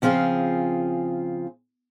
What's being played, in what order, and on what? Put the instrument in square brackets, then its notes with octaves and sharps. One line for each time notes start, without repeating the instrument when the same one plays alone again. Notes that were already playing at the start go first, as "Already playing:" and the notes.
[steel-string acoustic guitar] C#3 F3 C4 F4 G#4